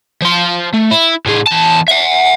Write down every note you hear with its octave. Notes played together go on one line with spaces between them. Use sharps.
F3 C6
A3
E4
A2 G#4
E2 A5
E5 F#5